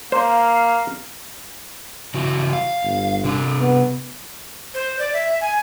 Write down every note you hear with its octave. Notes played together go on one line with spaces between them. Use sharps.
A#3 C5 F5
C#3 E3 F#4
F5
G1
C3 D4
B3
C5
D5
E5
G#5